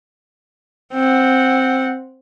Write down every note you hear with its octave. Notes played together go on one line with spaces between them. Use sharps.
C4 F#5